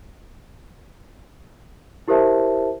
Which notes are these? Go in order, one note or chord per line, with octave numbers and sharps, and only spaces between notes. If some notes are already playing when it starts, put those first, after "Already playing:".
E4 G4 A#4 C5 E5 A5